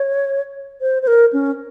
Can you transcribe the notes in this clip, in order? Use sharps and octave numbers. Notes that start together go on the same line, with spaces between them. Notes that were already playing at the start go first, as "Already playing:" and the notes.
Already playing: C#5
C5
C5
A#4
C#4